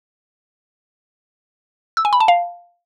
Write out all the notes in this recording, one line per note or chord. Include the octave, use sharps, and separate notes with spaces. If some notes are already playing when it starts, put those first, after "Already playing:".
E6
G#5
B5
A5
F5